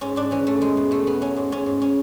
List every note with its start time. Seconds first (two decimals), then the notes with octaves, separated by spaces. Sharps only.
0.01 G#2 C#4
0.16 G#2 D4
0.31 E3 C#4
0.46 G#2 A3
0.61 E2 G#3
0.77 B2
0.91 B2 A3
1.07 E2 B3
1.21 F#3 C#4
1.36 G#2
1.52 G#2 C#4
1.66 G#2
1.82 C#4